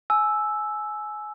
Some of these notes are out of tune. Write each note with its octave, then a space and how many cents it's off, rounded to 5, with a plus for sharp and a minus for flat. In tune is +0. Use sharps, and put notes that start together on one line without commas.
G#5 +25 E6 +0